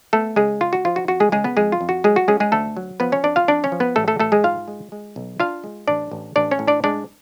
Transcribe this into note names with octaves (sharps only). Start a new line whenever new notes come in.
A3 B3 A4
C#3 G#3 G#4
C#2 F4
F#4
F3 F4
F#4
F2 F#4
G#3 G#4
C#3 G#3 G#4
B3 B4
F2 G#3 G#4
F4
F2
F#4
F#3 G#3 G#4
F#4
G#3 C#4 G#4
G#3 G#4
D2 A3 A4
F#3
F3 B3 B4
C#4 C#5
F2 D4 D5
F4 F5
F2 D4 D5
C#4 C#5
F3
B3 B4
A1 A3 A4
A3 A4
A1 A3 A4
G#3 G#4
G#2 F4 F5
G#3
G#3
B1
D4 F4 F5
G#3
A1 D4 D5
A1
A1 D4 D5
C#4 C#5
A2
D4 D5
G#3 D4 D5